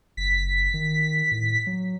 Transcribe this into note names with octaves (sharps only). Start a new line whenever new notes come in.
F#1 B6
D#3
A2
F#3